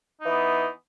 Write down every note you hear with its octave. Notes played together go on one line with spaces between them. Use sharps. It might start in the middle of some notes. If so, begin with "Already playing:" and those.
E3 B3 D#4